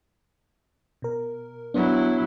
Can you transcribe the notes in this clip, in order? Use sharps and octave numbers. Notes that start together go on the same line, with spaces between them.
B2 A#4
F#3 B3 D4 E4